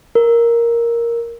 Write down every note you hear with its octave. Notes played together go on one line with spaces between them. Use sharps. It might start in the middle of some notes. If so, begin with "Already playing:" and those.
A#4